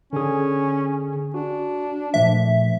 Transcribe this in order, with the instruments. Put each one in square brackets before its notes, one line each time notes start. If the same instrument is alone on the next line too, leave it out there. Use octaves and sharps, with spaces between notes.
[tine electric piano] D3 G#4 [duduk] C#4
[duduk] D4 [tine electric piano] F#4
[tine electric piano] A#2 F3 A3 [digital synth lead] E5